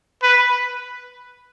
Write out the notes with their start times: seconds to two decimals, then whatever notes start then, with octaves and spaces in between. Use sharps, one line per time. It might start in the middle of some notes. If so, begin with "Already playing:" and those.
0.23 B4